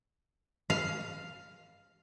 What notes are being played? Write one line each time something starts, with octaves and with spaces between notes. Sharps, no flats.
F5